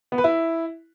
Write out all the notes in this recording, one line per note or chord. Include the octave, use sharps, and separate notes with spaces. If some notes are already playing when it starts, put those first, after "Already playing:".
B3
B4
E4